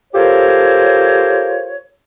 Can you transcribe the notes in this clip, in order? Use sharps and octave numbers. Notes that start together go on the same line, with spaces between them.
F4 G4 A4 A#4 C5 C#5